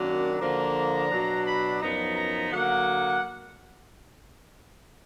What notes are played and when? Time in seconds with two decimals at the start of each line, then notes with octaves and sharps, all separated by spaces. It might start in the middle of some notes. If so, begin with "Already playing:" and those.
Already playing: F#2 D#3 F#3 A#3 D4
0.40 D3 F3 A#3 D4 A#5
1.10 B2 F#3 D4
1.46 B5
1.81 F#2 F3 B3 D#4 A#5
2.16 A#5
2.51 D3 F#3 A#3 F#5